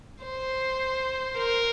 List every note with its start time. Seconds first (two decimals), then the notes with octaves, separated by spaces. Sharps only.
0.24 C5
1.38 A#4